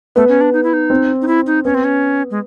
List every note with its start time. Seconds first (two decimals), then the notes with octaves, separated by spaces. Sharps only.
0.16 A3 B3
0.29 C#4
0.41 D4
0.53 D#4
0.63 E4
0.73 D#4
0.90 C4
1.22 D#4
1.27 E4
1.47 D#4
1.65 B3 C#4
1.75 C4
1.84 C#4
2.31 G#3